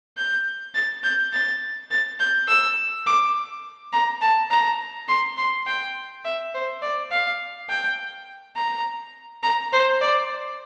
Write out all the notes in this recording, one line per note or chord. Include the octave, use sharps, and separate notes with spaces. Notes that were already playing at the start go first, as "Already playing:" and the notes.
G6
A6
G6
A6
A6
G6
E6
D6
A#5
A5
A#5
C6
C6
G5
E5
C5
D5
F5
G5
A#5
A#5
C5
D5